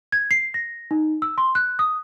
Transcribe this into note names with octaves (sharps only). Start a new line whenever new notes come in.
G#6
C7
A#6
D#4
E6
C6
F#6
D#6